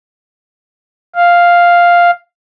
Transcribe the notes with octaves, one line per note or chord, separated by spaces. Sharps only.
F5